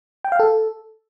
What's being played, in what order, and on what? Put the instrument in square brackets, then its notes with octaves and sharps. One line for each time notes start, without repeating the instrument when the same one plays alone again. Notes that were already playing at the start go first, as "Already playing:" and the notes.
[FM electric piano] G5
F5
A4